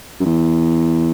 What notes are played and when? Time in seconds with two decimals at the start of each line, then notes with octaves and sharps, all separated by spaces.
0.20 F#2
0.25 E2